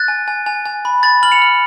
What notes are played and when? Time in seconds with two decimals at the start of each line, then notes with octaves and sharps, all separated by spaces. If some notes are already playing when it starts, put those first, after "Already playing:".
Already playing: F#6 A6
0.08 G#5
0.28 G#5
0.46 G#5
0.65 G#5
0.85 B5
1.03 B5 A6
1.23 F6 F#7
1.32 C#7 F7
1.42 F6